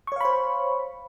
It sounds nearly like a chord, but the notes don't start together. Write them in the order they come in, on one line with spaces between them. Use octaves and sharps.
C#6 C#5 F5 B5 C5